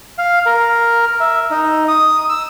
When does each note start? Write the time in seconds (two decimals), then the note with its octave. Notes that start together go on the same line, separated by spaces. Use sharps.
0.18 F5
0.46 A#4
1.20 E5
1.51 D#4
1.88 D#6
2.29 E6